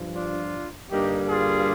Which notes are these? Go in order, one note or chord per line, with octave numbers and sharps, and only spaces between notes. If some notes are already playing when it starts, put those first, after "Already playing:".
Already playing: G2 F3
D4 F4
G2 D3 G3 A#3 D#4 G4
F4 G#4